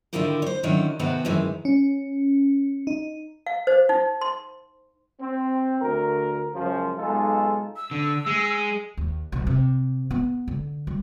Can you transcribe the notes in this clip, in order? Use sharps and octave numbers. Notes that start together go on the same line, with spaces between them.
D3 D#3 E4 F4 G4 A#4
C5 C#5
D3 D#3 F#3 C#4 E4
C3 D#3 B3 C4 F#4 A4
F#2 D#3 E3 G#3
C#4
D#4
F5
C5
D#4
C6
C4
D2 A#4
C#2 F#2 F3
B1 G#3 D#4 F4 A4
E6
D3
G#3
D#2
B1
C3
B3
D3
G3